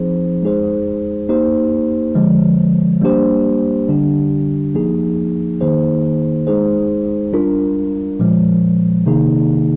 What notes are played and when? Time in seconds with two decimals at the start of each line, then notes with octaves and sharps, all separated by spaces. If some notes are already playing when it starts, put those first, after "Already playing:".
Already playing: F3 C4 D#4 G#4 C5
0.42 G#3 D#4 G#4 C5
1.29 A#3 D#4 G4 C5
2.15 D3 F3 G#3
3.01 G3 A#3 D4 G4 C5
3.88 D3 G3 D4 G4
4.74 F3 A#3 D#4 G#4
5.61 D#3 A#3 D#4 G#4 C5
6.47 G#3 D#4 G#4 C5
7.33 G3 D4 F4 A#4
8.19 A#2 F3 G#3
9.06 C3 D#3 A#3 D#4 G#4